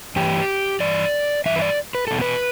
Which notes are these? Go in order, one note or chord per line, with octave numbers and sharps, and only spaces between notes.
G2 E3 G4
G2 E3 D5
G2 E3 E5
B4
D5
B4
E2 B2 A4
B4